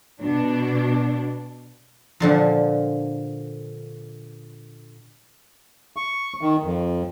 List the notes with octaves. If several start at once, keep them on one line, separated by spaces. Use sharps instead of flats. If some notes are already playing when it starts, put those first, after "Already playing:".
B2 D4
A#2 D3 F3
C#6
D#3
F2